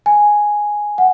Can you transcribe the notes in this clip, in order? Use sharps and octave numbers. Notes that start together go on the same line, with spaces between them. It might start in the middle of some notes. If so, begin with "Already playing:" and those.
G#5
F#5